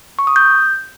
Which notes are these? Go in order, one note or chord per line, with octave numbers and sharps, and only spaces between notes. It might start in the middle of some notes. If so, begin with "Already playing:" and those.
C#6
D#6
G6